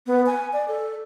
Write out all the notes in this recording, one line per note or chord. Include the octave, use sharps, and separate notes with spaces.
B3
G#5
D5
A4